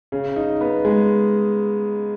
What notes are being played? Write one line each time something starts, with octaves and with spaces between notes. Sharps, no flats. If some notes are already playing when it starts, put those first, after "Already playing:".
C#3
D#4
B3
G#3